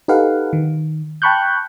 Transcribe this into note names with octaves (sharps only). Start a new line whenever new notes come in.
D#4 G4 A4 B4 F5 F#5
D#3
G5 A5 B5 C#6 F#6 G6